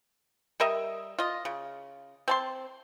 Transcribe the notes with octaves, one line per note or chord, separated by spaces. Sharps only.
G3 A#4 D#5 E5
F4 D#5
C#3
C4 A5 C6